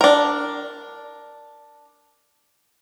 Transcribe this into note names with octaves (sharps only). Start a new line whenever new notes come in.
D4 A#4